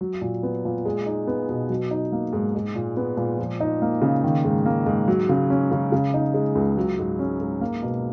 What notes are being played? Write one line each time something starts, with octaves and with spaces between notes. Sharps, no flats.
F#3
A#2
B3
A#2
G#3
D#4
B3
B2
F#3
D#4
A#3
G#2
G#3
A#2
B3
A#2
F3
D#4
A#3
C#3
D#3
G#2
A#3
G#2
F#3
C#3
C#4
C#3
C#3
D#4
G#3
C#2
F#3
G#2
C#4
G#2
A#3
B2